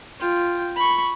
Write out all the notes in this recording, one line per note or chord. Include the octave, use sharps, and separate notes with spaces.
F4 G5
B5 C#6